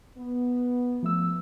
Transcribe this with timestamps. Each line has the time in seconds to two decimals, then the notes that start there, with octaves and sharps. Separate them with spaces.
0.17 B3
1.03 F3 A3 E6